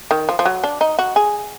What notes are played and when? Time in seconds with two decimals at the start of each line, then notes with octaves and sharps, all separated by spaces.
0.11 D#3
0.29 F3
0.39 F3
0.45 F#3
0.64 D4
0.81 D#4
0.99 F#4
1.16 G#4